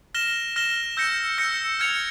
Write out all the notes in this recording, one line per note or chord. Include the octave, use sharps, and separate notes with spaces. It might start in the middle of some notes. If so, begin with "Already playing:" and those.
F6 A#6 E7 G7
F6 A#6 E7 G7
E6 G6 A#6 C#7
E6 G6 A#6 C#7
F6 G#6 C#7 F7